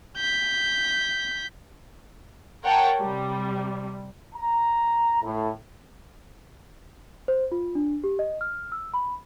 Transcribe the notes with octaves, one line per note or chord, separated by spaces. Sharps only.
G6 B6
A#4 C#5 F#5 G5 A5
C3 G3
A#5
A2
C5
F4
D4
G4
D#5
F6
E6
B5